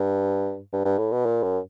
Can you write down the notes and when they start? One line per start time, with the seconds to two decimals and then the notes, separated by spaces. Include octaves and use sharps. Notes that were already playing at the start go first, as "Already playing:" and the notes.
Already playing: G2
0.73 G2
0.85 G2
0.98 A2
1.12 B2
1.26 A#2
1.43 F#2